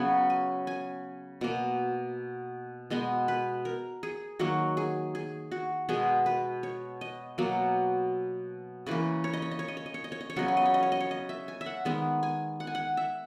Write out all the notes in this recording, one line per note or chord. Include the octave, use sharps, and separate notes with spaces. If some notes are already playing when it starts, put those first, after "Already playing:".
Already playing: C#3 F#3 B3 G#5
G#5
G#5
B2 A#3
B2 G#3 B3 D#5
B4
A#4
G#4
D#3 F#3 A#3 F#4
G#4
G#4
F#4
B2 G#3 B3 G#4
B4
C#5
D#5
B2 F#3 A#3
C#3 E3 A#3 B4
C#5
D#5
C#5
D#5
C#5
D#5
C#5
D#5
C#5
D#5
C#5
D#5
C#5
C#3 F#3 B3 D#5
C#5
D#5
C#5
D#5
C#5
D#5
C#5
D#5
E5
G#5
E5
F#5
D#3 G#3 B3 E5
G#5
F#5
G#5
F#5
E5